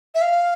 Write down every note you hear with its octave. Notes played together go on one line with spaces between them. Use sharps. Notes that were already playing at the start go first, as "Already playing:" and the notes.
E5
F5